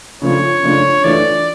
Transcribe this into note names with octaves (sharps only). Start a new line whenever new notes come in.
C#3 F3 A3 D4 F4 C#5
C#3 F3 A3 D4 F4
E3 A3 D4 F4 D5